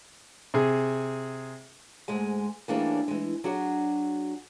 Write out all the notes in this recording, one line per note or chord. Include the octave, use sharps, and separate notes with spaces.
C3 G#4
D2 G#2 G#3 G#5
E3 G3 A#3 C#4 D4 G#4
E3 G#3
F#3 D4 F#4 G#4